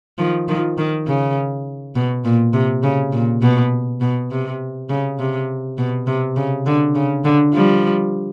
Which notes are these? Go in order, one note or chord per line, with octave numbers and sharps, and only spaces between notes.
D#3 F3
D#3 F3
D#3
C#3
B2
A#2
C3
C#3
A#2
B2
B2
C3
C#3
C3
B2
C3
C#3
D3
C#3
D3
F3 G3